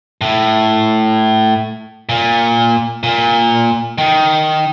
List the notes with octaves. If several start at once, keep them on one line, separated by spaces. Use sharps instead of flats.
A2
A#2
A#2
D#3